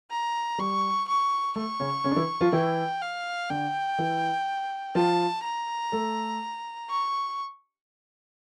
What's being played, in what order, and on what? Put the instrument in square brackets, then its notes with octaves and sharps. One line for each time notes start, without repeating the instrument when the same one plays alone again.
[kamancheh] A#5
[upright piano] G3 [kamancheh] C#6
[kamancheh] C#6
[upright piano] A3 [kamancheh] C#6
[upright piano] C#3 C#4
C#3 C#4
D4
E3 E4
F3 F4
[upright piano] E3 E4 [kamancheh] G5
[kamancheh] F5
[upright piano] D3 D4 [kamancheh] G5
[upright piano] E3 E4
[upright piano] F3 F4 [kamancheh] A5
[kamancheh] A#5
[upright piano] A3 A4
[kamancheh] C#6